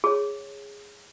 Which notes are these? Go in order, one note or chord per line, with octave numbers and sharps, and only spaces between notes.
G#4 C#5